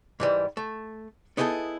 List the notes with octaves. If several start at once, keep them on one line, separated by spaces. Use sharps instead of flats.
G#2 E3 G3
A3
B3 D#4 E4 F#4 G#4 A4